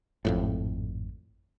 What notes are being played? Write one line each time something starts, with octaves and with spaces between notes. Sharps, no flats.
G#1 F2 A2